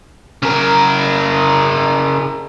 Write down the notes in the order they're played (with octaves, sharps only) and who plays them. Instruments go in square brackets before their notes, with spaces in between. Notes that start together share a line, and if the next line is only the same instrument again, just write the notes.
[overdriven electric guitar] C#3 A#4